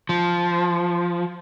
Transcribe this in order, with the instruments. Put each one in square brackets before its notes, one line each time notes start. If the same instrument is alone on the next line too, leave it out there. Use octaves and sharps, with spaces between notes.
[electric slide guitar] F3